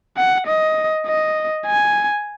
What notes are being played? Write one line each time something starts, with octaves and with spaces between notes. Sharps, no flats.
F#5
D#5
D#5
G#5